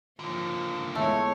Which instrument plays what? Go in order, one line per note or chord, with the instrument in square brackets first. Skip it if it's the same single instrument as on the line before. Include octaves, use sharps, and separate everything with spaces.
[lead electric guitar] D3 A#3 [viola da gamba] F3
[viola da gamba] E2 G#3 C#5 [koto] A3